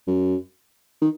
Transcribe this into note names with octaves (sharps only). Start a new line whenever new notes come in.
F#2
D#3